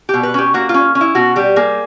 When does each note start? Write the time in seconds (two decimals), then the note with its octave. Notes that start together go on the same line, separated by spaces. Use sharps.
0.09 B2 G4
0.23 B4
0.34 C#4 G4
0.54 A#3 F#4
0.69 F4
0.74 C#4
0.95 C#4
1.01 E4
1.15 B2 F#4
1.36 G3 G4
1.56 A#3 G#4